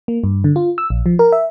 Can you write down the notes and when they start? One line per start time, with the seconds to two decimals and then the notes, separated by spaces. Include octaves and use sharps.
0.08 A#3
0.24 G2
0.44 D3
0.56 F4
0.78 E6
0.90 A#1
1.06 F3
1.19 A#4
1.32 E5